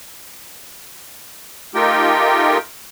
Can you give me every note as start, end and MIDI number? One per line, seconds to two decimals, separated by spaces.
1.75 2.58 57
1.75 2.58 63
1.75 2.58 65
1.75 2.58 67
1.75 2.58 70
1.75 2.58 79